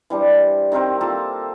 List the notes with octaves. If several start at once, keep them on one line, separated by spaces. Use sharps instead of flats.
E3 G3 D4 C5
D#3 C4 A#4 C5
A#3 F4 A4 A5